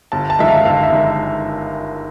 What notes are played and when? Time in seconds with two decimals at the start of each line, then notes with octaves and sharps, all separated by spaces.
0.12 G1 A5
0.30 A5
0.39 F#2 D#3 G#3 E5
0.48 F5
0.65 G1 F5
0.83 E5
0.92 D#3 G#3